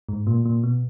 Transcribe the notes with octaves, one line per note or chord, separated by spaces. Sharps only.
G#2
A#2
A#2
B2